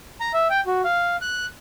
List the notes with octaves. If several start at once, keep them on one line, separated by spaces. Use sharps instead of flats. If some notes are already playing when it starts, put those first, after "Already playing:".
A#5
E5
G5
F#4
F5
F#6